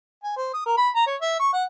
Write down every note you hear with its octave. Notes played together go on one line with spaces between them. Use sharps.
G#5
C5
D#6
A#4
B5
A#5
C#5
E5
C#6
F#5